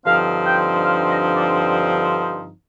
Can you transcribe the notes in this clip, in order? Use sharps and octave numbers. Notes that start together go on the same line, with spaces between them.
G2 D3 F3 C4 D#4 F5
G5
F5
D#5
D5